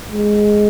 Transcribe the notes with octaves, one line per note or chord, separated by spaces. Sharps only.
G#3